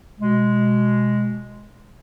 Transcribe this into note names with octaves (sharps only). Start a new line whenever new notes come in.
B2 G#3